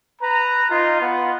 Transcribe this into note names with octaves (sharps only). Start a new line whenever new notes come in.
B4 A#5
D#4 F4
B3 F4